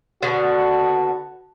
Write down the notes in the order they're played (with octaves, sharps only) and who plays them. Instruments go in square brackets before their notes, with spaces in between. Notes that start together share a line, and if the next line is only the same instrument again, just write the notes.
[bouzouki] B2 D3 [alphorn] F#4